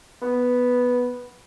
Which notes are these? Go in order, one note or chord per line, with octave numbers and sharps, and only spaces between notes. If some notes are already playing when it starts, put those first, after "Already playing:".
B3